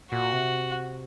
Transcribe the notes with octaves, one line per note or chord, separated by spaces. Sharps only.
A#2 F#4
C3